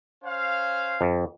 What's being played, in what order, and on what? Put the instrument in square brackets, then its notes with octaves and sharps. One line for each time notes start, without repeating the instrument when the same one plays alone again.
[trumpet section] C#4 C5 F5
[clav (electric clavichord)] F2